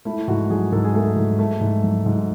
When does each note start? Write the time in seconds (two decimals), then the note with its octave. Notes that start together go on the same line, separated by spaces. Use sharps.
0.05 A3 E4
0.28 G#2 F#4
0.50 F#3 G#4
0.72 G#2 A4
0.84 G#4
0.94 A3 A4
1.17 G#2
1.39 A3
1.61 G#2
1.83 F#3
2.06 G#2